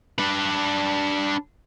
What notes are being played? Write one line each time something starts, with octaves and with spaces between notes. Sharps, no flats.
D4 B4